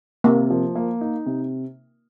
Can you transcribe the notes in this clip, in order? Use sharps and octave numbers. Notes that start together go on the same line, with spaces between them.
C3 A#3
F3
A#3
D#4
C3